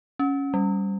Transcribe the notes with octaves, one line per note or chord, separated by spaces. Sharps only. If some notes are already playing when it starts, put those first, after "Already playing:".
C#4
G3